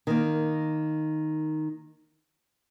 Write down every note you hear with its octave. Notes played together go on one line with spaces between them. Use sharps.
D#3 A#3